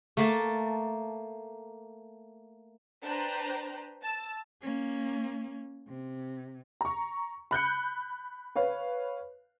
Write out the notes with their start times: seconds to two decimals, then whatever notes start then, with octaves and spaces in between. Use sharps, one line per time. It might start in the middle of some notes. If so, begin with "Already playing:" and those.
0.17 A3 A#3 A5
3.03 D4 B4 C5 G5 A#5
4.02 A5 E6
4.62 A#3 C#4
5.88 C3
6.81 A#5 C#6
7.51 B5 F#6 G6 C#7
8.56 B4 C#5 F5